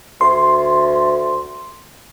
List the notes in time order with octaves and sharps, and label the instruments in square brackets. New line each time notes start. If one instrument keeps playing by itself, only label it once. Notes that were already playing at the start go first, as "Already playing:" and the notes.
[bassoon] D2 [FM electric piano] C6